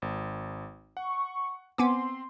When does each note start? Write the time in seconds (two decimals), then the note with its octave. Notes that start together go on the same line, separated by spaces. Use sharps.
0.02 G#1
0.97 F#5 C#6
1.78 B3 C4 G#5 C6 D6